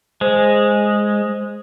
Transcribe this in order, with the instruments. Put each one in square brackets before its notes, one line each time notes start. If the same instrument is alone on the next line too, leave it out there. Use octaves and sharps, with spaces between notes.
[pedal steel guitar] G#3 [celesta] C5